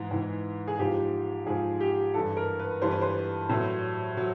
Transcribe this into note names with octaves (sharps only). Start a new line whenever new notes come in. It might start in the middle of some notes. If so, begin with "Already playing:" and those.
Already playing: G#2 E3
G#2 E3
G#4
G#2 F3 G4
G#2 F3 G#4
G4
G2 E3 A4
A#4
B4
G2 E3 C5
B4
C5
A2 F#3
F#3